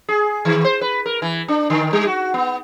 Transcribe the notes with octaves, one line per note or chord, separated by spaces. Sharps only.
G#4
D#3
C5
B4
A#4
E3
D4
D3
G3
F#4
B3